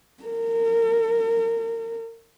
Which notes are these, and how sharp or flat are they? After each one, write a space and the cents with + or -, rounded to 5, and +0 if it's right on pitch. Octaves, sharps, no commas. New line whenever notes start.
A#4 -30